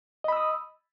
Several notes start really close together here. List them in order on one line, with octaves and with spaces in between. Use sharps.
D#5 B5 E6 D#6